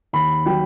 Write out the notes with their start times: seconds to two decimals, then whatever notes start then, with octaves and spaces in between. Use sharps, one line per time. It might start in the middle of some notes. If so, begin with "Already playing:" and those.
0.13 D#2 B5
0.46 D#3 F#3 G5